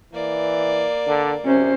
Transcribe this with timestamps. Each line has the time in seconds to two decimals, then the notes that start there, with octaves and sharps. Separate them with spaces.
0.14 E3 A#3 D5
1.07 D3
1.45 C3 C#4 C5